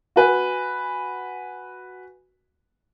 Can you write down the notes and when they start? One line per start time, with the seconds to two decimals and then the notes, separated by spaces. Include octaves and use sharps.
0.16 F#4 B4 G#5